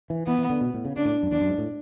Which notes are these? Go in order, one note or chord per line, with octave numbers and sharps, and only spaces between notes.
E3
E3 B3
E3
D3
B2
A2
C#3
C#3 D4
A2
F#2
E2 D4
F#2
G#2
A2